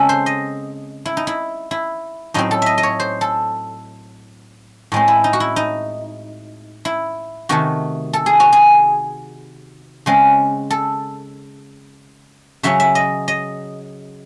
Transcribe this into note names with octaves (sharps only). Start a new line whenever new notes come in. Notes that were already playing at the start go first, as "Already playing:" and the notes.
Already playing: C#3 G#3 C4 A4
C5
D#5
E4
D#4
E4
E4
A2 F#3 C4 D#4
A4
D#5 E5
D#5
C#5
C5
A4
A2 G#3 C4
E4
D#4
F#4
E4
D#4
E4
C3 D#3 A3 F#4
A4
G#4
F#4
G#4
C#3 G#3 C4
A4
C#3 F#3 C#4 E5
E5
D#5
D#5